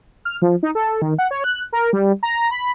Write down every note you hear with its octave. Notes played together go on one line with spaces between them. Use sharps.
F6
F3
D#4
A4
D#3
F#5
C#5
F#6
A#4
G3
A#5
B5